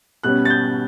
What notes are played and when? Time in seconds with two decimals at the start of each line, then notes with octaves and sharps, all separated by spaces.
0.23 B2 G3 C#4 F#6
0.45 A6
0.50 G6